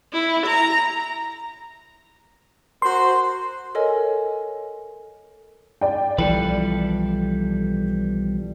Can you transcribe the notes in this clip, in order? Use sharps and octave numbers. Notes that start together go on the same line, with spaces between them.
E4
A#5
F#4 A#4 C5 C6
A4 A#4 C#5 D#5 G#5
D5 G5
B1 E3 F3 G3 A4 B4